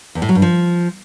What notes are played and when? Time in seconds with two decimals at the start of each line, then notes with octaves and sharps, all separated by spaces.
0.15 E2
0.22 A2
0.29 F#3
0.35 G2
0.42 F3